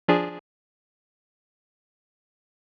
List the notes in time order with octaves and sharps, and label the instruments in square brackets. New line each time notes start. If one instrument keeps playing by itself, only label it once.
[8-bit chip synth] F3 D4 G#4